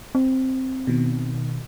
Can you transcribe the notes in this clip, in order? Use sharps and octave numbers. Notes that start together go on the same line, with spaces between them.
C4
B2 D#3